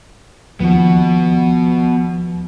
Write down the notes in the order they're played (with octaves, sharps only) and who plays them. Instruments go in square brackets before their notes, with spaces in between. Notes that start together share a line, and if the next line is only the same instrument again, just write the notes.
[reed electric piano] D#2 F3 [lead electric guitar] B3 F#4